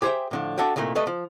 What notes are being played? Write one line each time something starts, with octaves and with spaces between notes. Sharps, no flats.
G4 G#4 C5 D#5 E5 G5
A2 D3 F3
D4 F#4 A4 E5 F#5 G5
C2 A#2 D#3 A3 A#3
G3 A3 A4 B4 D#5
F3